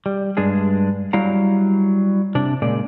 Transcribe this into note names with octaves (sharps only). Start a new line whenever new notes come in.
G3
G2 G#3 D4 G#4
F#3 G3 E4 F5 A#5
C3 D4
A#2 C#3 G#3 D5